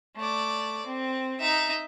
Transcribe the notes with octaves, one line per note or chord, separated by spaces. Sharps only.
A3 D5
C4
D#4 E5